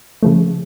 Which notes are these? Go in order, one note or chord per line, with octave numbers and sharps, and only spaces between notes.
C#3 F3 A3